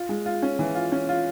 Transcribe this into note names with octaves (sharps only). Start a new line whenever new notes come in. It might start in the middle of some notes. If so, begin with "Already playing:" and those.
Already playing: F4
G#3
F4
C#4
E3
F4
C#4
F4